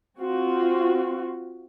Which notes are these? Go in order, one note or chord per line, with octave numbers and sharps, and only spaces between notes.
C4 F4 F#4